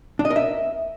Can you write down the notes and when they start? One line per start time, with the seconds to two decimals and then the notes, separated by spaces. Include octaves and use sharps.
0.19 D4
0.25 D#5
0.30 A#4
0.36 E5